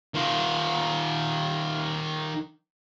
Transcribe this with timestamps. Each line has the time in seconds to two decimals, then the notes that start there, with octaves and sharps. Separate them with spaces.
0.14 D#3 F4